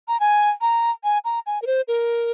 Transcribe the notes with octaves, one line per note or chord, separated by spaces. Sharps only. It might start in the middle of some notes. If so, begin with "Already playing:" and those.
A#5
G#5
A#5
G#5
A#5
G#5
A#4
C5
A#4